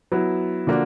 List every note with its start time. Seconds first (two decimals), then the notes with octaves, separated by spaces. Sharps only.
0.12 F#3 B3 E4
0.67 D3 F3 A#3 D4 F#4